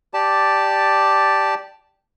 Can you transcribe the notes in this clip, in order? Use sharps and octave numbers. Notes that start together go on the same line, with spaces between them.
G4 D5 A5